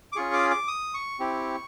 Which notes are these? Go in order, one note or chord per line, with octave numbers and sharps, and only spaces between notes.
D6
C#4 F4 G#4 C#6
D6
D6
D#6
C#6
C4 E4 G4